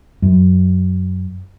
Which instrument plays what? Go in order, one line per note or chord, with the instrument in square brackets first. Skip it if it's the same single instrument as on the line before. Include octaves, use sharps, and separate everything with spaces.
[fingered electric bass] F#2